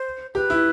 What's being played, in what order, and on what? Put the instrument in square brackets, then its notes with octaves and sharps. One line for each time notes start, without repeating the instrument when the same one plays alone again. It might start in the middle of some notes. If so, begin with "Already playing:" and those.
Already playing: [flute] C5
[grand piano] G4 [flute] B4
[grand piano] E4